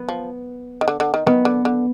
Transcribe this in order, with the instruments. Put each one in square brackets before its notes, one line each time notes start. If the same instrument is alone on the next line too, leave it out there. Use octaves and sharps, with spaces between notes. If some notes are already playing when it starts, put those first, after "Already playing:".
Already playing: [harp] B3
[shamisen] F3
D#3
D3
D3
D#3
[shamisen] D#3 [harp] B3
[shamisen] D3
D3